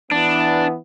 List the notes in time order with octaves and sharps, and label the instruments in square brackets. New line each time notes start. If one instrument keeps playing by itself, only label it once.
[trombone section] E3 B3 [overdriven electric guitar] D4